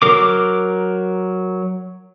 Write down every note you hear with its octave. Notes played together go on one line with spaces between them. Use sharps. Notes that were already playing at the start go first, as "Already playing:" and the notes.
F#3 A#4 D6